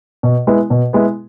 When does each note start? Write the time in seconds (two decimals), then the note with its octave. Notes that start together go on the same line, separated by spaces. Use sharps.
0.23 B2
0.47 G#3 B3 E4
0.70 B2
0.93 G#3 B3 E4